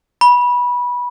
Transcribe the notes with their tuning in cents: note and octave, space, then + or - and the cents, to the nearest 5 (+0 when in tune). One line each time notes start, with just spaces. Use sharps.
B5 -20